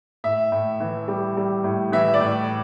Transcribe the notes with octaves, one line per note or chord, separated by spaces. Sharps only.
A2 E5
A2
E3
G3
G3
A2
E3 E5
D5
A2